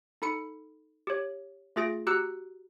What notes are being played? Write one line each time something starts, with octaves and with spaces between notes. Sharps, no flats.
D#4 A4 B5 C#7
G4 C#5
A3 F4 G#4 A6 A#6 D7
F#4 G4 A#5 E6 F#6 C#7